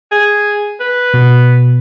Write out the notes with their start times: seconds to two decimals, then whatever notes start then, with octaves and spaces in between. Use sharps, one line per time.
0.12 G#4
0.80 B4
1.14 B2